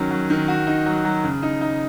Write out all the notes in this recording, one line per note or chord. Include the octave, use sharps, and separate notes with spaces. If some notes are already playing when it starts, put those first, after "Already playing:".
Already playing: D#3 F#3 C#4
F#3
D#3
F#4
D#4
F#3
F#3
C#3
D#4
D#4